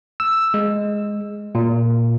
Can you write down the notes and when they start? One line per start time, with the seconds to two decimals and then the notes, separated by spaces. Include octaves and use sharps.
0.20 E6
0.54 G#3
1.55 A#2